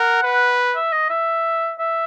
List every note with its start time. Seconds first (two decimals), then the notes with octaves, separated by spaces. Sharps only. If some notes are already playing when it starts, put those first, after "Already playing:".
Already playing: A#4 F#5
0.23 B4
0.75 E5
0.92 D#5
1.10 E5
1.79 E5